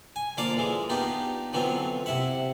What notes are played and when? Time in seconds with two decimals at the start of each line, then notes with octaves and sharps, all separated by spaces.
0.16 G#5
0.37 D3 F3 A#3 D5 F5 D6
0.57 E3 G#3
0.90 B3 D4 D#4 F4 G4
1.53 D3 E3 F#3 B3 C4 F4
2.06 C3 E4 E5 F#5